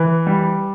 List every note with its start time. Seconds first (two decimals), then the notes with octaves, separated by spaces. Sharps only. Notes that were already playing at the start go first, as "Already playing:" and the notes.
Already playing: E3
0.27 G3